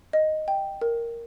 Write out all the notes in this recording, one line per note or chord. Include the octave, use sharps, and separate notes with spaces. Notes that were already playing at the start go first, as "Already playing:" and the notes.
D#5
G5
A#4